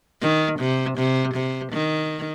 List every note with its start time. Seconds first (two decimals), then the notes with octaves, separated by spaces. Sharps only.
0.22 D#3
0.60 C3
0.98 C3
1.35 C3
1.73 D#3